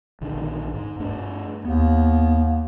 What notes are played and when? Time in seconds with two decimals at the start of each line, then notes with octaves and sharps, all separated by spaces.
0.21 A#1 D3 D#3
0.74 G#2
1.00 G2 A3 D4
1.65 D#2 B3